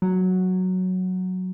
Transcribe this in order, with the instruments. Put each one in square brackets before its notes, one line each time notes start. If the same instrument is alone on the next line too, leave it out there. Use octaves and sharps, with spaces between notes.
[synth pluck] F#3